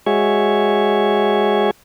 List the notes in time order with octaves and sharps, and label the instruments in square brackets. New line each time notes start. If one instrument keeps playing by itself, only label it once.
[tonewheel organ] G#3 F#4 G#4 C#5 E5 C#6